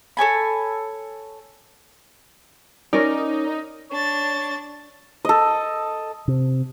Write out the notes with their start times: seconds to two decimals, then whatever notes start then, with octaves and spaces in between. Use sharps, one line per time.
0.17 A4 C#5 G#5 B5
2.93 C#4 D#4 A#4 D5
3.90 D4 C#5 A6
5.25 A4 D#5
6.28 C3